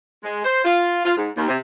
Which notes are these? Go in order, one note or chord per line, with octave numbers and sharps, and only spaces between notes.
G#3
C5
F4
F4
G#2
D#2
C3